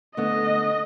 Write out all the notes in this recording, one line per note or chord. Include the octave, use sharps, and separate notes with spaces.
D3 A3 B3 D#5